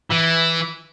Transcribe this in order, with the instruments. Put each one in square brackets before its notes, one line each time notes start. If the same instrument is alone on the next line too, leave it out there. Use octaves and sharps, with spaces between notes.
[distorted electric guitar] E3